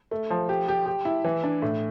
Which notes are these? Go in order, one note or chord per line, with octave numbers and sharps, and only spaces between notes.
A3
F3
G4
G4
G4
E4
E3
D4
A2